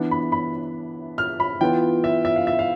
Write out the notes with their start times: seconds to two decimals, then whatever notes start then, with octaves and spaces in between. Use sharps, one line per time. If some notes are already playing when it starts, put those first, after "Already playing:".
Already playing: E3 B3 D4
0.11 B5
0.32 B5
1.18 F6
1.40 B5
1.61 E3 B3 F4 G5
2.04 E5
2.25 E5
2.36 F5
2.47 E5
2.59 F5